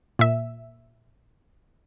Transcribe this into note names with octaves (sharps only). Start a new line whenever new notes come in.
A#2 E5